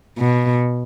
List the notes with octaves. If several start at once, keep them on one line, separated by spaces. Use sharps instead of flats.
B2